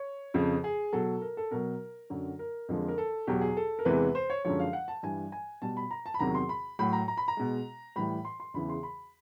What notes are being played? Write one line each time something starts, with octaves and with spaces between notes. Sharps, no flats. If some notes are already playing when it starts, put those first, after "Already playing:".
Already playing: C#5
F2 C#3 F3
G#4
B2 F#3 A4
A#4
A4
B2 F#3 A#4
F#2 D3 F#3
A#4
F2 D3 F3 G#3
A#4
A4
E2 B2 F#3 G4
G#4
A4
A#4
E2 C3 E3 G#3 B4
C5
C#5
F#2 D3 F3 G#3 C#5
F5
F#5
A5
G2 E3 G3 G#5
G#5
B2 G3 A5
B5
A#5
A5
B5
E2 C3 D#3 F#3 A#5
C6
B5
A2 F#3 B5
A#5
A#5
B5
A#5
B2 G#3
A2 E3 G3 B5
C6
C6
E2 C#3 E3 B5
C6
B5